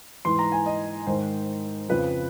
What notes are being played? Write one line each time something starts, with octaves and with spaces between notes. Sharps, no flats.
G#2 E3 C6
A#5
G#5
D#5
G#2 D#3 C5
F2 C#3 F3 B4